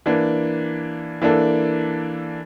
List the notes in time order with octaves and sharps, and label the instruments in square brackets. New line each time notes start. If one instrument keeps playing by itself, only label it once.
[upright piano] E3 A#3 D4
E3 A#3 D4 A4